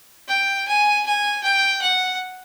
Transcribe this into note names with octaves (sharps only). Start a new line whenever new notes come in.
G5
G#5
G#5
G5
F#5